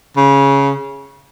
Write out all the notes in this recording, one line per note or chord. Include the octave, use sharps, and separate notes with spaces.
C#3